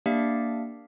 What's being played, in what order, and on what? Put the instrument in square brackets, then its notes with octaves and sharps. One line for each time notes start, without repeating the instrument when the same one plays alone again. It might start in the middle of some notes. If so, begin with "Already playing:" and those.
[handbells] A#3 D4 G4 D5 E5 F5